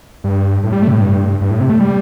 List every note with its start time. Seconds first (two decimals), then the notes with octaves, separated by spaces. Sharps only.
0.24 G2
0.63 A2
0.73 G3
0.82 A3
0.88 C3
0.92 A2
1.02 G2
1.41 G2
1.50 A2
1.60 C3
1.70 A3
1.80 G3